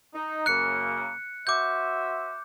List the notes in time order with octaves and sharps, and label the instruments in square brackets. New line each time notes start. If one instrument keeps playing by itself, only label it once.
[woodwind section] D#4
[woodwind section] F#2 C#3 A#3 [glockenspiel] F#6 C#7
[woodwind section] F#4 C5 E5 [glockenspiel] D6 G6